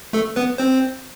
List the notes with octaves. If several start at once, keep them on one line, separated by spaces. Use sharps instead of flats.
A3 A4
B3 B4
C4 C5